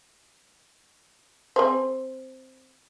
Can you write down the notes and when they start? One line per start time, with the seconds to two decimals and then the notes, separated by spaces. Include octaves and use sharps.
1.56 C4 G#4 C5